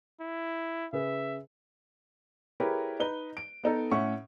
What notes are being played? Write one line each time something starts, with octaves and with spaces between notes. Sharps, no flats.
E4
C#3 G#4 B4 E5
E4 G4 G#4 A#4 B4 C#5
D#4 B4 G7
D7
B3 D#4 A4
A2 C#4 E5 F#5 C#6